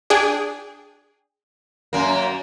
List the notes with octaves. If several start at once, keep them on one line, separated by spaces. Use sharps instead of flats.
D4 G#4 G5
F#2 A#3